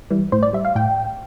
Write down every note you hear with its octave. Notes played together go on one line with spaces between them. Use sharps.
E3 G3
A2 C5
D5
G3 E5
F5
A2 G5